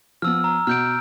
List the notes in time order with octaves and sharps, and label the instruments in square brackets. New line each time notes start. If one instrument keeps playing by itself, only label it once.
[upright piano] F3 B3 [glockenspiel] E6 F6
[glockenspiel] A#5
[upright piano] B2 [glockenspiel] F6 G6 D7